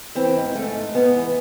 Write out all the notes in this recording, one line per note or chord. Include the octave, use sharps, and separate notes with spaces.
E3 C4
G#2
G#2 A3
G#2
G#2 B3
E3